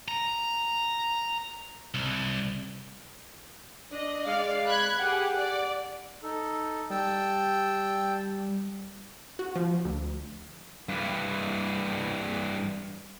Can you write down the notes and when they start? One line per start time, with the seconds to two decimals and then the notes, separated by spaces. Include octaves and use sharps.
0.08 A#5
1.94 C2
3.92 D4 D#5
4.26 G#3 D5 F5
4.65 B5 F#6 G#6
4.99 G4 G#4 F#5
5.35 D5
6.23 D#4 A4
6.90 G3 G5 A5 E6
9.39 F#4
9.56 F3
9.85 D2
10.89 G2 E3